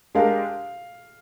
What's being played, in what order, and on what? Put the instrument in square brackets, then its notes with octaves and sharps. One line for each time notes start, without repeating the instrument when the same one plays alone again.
[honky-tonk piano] G#3 D4 G4 A#4 [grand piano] F5